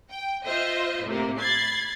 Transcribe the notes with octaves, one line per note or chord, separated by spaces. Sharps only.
G5
F4 C5 D#5 E5
A2 C3 A#3
B5 G#6 A6 C7